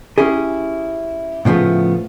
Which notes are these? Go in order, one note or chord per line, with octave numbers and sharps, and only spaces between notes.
C#4 E4 G4 G#4
A2 C#3 F3 A3 B3